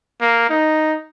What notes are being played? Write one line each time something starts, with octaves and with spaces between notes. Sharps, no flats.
A#3
D#4